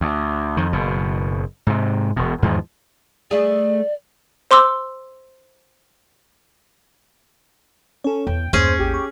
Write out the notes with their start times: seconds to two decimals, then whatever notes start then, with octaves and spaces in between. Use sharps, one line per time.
0.01 D2
0.57 F2 D#3
0.73 F#1 B2
1.67 G#2 C3
2.16 E1 B2
2.42 E2 G#2 D#3 F3
3.31 A3 G#4 D5
4.51 C5 C6 D6 E6
8.04 C#4 A4 C#5
8.27 E2 G5
8.53 E2 G2 A#3 C#4 G#4 C5
8.79 A1 G4
8.94 C#6